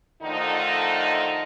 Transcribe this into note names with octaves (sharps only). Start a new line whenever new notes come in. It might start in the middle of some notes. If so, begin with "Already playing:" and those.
D3 D#3 F3 A3 D#4